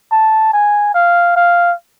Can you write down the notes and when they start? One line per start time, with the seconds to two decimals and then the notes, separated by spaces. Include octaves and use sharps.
0.12 A5
0.53 G#5
0.95 F5
1.36 F5